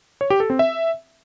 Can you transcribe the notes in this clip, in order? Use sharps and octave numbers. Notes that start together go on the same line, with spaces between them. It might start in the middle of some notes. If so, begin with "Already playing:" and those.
C#5
G4
A4
C4
E5